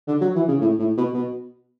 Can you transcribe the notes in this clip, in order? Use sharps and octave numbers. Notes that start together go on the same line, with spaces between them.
D3
F#3
E3
C#3
A2
A2
B2
B2